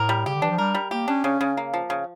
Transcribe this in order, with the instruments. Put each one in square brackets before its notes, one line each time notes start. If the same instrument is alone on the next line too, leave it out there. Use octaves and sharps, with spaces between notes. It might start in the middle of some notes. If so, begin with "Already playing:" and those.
Already playing: [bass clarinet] A2 [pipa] A#4
[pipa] G3
[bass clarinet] C#3 [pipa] G4
[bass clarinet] D3
[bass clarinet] E3 [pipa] D4
[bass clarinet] F3
[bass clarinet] G3 [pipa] A#4
[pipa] G3
[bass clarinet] A#3 [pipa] G4
[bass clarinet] C#4 [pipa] D4
[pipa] C#3 [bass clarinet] C#4
[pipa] C#3
A#3
F3
C#3